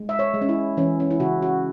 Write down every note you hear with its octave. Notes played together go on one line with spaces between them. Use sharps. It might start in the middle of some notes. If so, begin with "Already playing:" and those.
Already playing: G#3
E5
C#5
G#3
C#4
E4
E3 C#4
C#4
E4
C#3 F#4
F#4